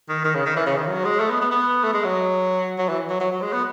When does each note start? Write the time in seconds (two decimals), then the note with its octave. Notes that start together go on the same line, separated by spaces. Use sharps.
0.09 D#3
0.25 D#3
0.35 C#3
0.46 D#3
0.56 E3
0.66 C#3
0.77 D#3
0.88 F#3
1.05 G#3
1.20 A3
1.30 B3
1.41 B3
1.52 B3
1.83 A3
1.93 G#3
2.04 F#3
2.78 F#3
2.89 E3
3.10 F#3
3.20 F#3
3.32 F#3
3.42 G#3
3.53 B3